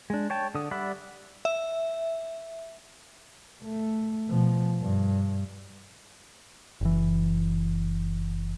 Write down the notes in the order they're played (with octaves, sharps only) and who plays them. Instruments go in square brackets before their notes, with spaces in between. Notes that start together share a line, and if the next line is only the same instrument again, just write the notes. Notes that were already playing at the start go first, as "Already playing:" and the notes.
[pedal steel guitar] G#3 D4
C#5 G5 A5
D3 D#6
G3 D5 E5 F#5 B5
[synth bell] E5
[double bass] A3
B2 F3
G2
[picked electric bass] F#1 E3